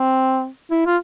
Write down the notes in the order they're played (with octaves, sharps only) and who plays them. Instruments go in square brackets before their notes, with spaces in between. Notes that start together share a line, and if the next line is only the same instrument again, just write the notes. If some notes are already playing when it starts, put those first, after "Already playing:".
Already playing: [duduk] C4
E4
F4